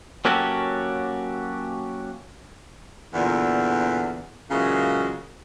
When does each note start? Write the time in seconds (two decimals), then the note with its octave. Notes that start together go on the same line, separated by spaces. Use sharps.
0.25 F#3 A#3 C#4 F#4 G4 A4
3.14 E2 A#2 D3
4.50 A#2 C#3 E3 F#3 G#3 A#3